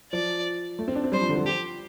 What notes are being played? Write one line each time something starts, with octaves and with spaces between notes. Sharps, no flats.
F3 D5
A3
C4
D4
C4
G3 C5
F3
D3
F3
G4